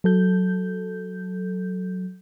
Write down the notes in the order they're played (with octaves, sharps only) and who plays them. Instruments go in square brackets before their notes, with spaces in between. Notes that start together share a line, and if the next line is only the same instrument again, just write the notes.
[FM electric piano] F#3 A4 G6